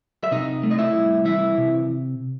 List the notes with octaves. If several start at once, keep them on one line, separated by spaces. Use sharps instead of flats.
E5
C3 D#4 D#5
A3
D#5
E4 E5
C2
E3 E4 E5
C3